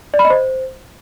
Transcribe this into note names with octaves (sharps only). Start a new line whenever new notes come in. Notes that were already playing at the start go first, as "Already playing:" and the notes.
D5
B5
D#5
C5